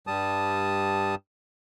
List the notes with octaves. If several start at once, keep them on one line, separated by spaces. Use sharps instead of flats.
G2 G3 A5 D#6